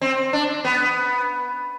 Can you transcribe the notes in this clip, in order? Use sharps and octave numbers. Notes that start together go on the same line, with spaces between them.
C4
D4
B3